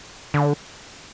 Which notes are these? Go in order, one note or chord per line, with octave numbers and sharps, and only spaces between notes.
D3